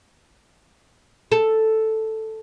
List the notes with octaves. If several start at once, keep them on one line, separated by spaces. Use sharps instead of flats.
A4